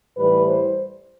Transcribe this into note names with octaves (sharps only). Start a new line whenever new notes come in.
A2 E3 G3 B4
C5